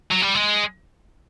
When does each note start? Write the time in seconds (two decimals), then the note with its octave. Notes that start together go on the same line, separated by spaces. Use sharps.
0.11 F#3
0.22 G3
0.35 G#3